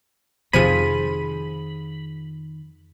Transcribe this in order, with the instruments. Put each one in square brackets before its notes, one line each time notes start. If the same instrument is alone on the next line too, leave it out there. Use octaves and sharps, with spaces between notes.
[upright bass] F2 D#3 [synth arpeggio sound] C3 F3 D#7 [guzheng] F4 G#4 [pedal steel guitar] B5